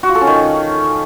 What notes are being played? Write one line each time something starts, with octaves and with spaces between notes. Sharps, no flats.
F#4
F4
A4
C#4
D#3